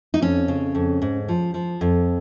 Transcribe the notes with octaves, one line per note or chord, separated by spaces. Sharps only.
D#4
F2 C#4
C#3
F2
G#2
F3
F3
F2